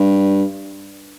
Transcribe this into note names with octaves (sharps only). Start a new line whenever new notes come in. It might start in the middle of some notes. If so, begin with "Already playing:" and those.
Already playing: G2